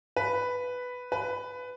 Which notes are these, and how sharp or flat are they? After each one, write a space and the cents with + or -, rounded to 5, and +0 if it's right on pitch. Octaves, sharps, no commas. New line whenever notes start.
B4 +5
B4 +15